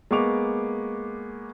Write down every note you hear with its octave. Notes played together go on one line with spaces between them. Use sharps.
G#3 A#3 B3 C#6 D6 F7